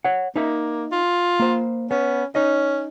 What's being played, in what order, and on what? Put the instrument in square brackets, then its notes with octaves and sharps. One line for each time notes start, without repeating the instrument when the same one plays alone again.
[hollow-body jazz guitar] C#5 F#5
[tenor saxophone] A#3 [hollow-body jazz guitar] D#4 D#5 E5
[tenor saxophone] F4
[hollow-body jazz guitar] A#3 C5
[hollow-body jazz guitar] B3 [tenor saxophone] C#4
[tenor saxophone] C#4 [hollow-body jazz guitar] D#4 D#5